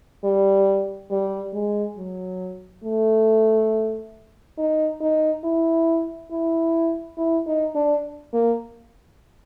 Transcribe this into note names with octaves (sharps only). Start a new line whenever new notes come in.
G3
G3
G#3
F#3
A3
D#4
D#4
E4
E4
E4
D#4
D4
A#3